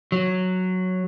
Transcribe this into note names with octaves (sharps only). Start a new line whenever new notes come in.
F#3